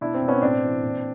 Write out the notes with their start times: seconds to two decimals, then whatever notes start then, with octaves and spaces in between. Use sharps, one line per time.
0.01 B2 D4 E4
0.14 C4
0.22 B2
0.28 B3 C#4
0.42 A2 C4 D4
0.63 E3
0.82 A#2